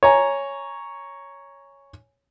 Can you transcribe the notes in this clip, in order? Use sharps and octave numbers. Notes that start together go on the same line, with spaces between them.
C#5 G#5 A#5